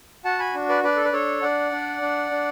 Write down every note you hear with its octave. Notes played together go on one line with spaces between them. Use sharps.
F#4 F#5 A5
G#5 B5
D4
B4 D5
D4 B4 D5
A4
B4
D4 A4 C#5
D4 D5 F#5
D4
D4
D4